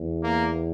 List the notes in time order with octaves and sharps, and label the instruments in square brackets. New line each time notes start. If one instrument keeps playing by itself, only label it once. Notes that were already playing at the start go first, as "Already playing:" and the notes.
Already playing: [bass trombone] E2
[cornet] A#3